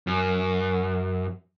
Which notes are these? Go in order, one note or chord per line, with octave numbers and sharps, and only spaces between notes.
F#2